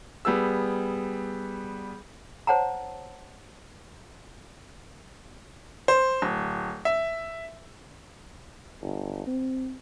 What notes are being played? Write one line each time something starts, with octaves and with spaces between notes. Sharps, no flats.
G3 B3 G#4 E6
C5 C#5 F#5 A5 A#5
C5
D1
E5
G1
C4